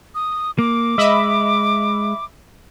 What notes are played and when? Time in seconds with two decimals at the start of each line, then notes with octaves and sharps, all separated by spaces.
0.15 D#6
0.58 A#3 D6
0.98 G#3 D#5 E5 B5